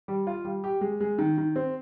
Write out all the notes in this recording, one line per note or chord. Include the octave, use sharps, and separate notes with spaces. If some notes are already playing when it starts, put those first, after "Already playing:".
G3
F4
G3
G4
G#3
G#3
D#3
D#3
C4